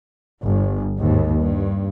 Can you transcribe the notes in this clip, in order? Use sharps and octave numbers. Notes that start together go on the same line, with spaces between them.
G1
D#2 G#2
G2